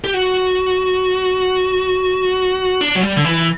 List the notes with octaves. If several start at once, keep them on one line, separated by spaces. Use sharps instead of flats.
G4
F#4
D4
F#3
G3
D3
E3